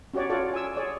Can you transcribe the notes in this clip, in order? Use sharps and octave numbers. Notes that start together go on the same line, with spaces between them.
C#4 F#4 G4 C#5 D5
F4 F#4 A4 C#5 D5
G#5 E6
G#4 C#5 D5